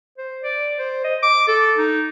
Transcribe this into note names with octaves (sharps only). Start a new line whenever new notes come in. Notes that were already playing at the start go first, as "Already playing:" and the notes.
C5
D5
C5
D#5
D6
A4
D#4